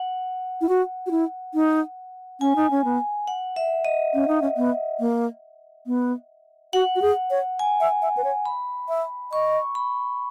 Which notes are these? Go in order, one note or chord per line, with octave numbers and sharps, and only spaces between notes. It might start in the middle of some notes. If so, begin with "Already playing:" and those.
Already playing: F#5
E4
F#4
F#4
E4
D#4
C#4 G#5
D#4
C#4
B3
F#5
E5
D#5
C#4
D#4
C#4
B3
A#3
B3
F#4 F#5
F#4
G#4
C#5
G#5
E5
E5
B4
C#5
B5
E5
D#5 C#6
B5